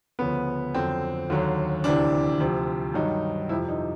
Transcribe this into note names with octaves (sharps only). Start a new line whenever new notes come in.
D2 C#3 F3 B3
F2 D3 F#3 C4
D#2 D3 F#3
D2 C3 E3 D4
D2 C3 F3
G2 D#3 F#3 D#4
F2 C3 F3 E4
D#4